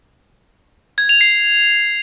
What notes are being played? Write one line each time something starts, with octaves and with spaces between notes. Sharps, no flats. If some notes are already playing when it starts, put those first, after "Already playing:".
G#6
F7
C7